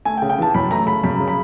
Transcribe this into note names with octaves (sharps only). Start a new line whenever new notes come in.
A3 G#5
G5
C#3
G5
E3 A5
F#2 B5
A3 A#5
C#3 B5
F#2 B5
C#3
B5